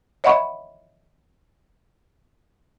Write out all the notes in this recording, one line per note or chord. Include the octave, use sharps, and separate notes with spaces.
C#5 D#5 E5 F#5 B5 C#6